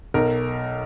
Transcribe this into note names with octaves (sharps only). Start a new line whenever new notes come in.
B1 A#4